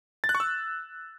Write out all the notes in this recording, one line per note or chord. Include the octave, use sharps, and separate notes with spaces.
A6
F#6
C#6
E6